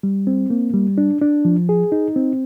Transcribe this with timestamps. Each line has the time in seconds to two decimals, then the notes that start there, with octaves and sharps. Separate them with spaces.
0.03 G3
0.27 C4
0.50 A#3
0.74 G3
0.98 D4
1.21 D4
1.45 F3
1.69 G#4
1.92 D#4
2.16 C4